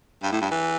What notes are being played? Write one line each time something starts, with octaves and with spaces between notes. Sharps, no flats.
G2
A2
G2
E3